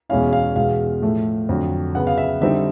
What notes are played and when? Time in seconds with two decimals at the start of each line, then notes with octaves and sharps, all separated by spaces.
0.09 E2 B2 G#3 C#4 E4 F5
0.33 F5
0.56 E2 B2 G#3 F5
1.02 A2 F3 A3
1.49 F2 D3 F#3
1.95 C#3 F#3 B3 F#5
2.07 F5
2.18 E5
2.41 D3 G3 C4 D#4 E5